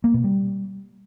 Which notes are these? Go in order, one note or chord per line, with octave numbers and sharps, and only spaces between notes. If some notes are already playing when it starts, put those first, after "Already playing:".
A#3
B2
G3